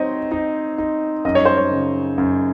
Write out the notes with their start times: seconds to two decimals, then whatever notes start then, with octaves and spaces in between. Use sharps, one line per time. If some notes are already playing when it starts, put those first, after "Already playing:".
Already playing: C4 D#4 C5 C#5 D#5
0.32 D#4
0.78 D#4
1.25 F#2 D#5
1.35 C#5
1.45 C5
1.57 C#5
1.71 C#3
2.18 F#2